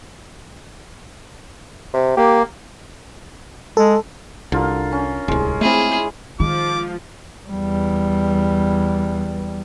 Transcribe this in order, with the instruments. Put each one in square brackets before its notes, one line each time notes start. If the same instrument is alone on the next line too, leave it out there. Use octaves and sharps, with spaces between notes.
[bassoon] C3
[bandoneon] A#3 [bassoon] G4
[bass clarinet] G#3 [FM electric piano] A4
[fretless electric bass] C2 [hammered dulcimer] D3 F4 A#4
[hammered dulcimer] C#4
[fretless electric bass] D1 C2 [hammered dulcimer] G#3
[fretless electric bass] A3 C4 [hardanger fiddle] E4 G#4
[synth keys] D#3 [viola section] F3 F4 [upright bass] G#3 [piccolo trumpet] D6
[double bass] E2 G3